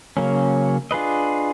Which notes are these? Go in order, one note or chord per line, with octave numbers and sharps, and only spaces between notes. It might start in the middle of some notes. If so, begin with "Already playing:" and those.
C#3 F#3 A#3 C#4
D4 F4 G#4 B4 D#5